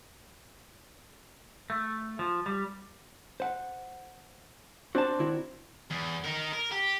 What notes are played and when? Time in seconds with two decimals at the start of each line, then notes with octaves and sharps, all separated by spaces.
1.70 A3
2.19 F3
2.46 G3
3.40 C5 F#5
4.95 C4 D4 F#4 A5
5.19 D#3 E4 F#4
5.91 E2
6.25 D#4 A#4
6.53 A#4
6.72 G4